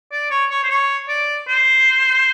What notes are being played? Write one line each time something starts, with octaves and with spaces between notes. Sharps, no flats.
D5
C#5
C#5
C5
C#5
D5
C5